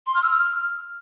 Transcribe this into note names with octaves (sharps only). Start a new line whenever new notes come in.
C6
F6
E6
F6